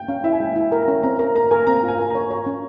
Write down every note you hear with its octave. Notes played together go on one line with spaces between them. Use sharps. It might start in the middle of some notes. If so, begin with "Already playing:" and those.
Already playing: G5
C#4 F5
E4 E5
G#5
G#3 G5
E4 G#5
A#4
A#5
C#4
C4 A#5
A#4 A#5
A#4 A#5
A#4 G#5
C4 A#5
F4
G#5
A#4
C#5 A#5
C#5 A#5
C#4